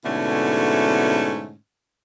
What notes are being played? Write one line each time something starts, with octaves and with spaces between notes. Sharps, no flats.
G#2 B2 D3 A3 C#4 E4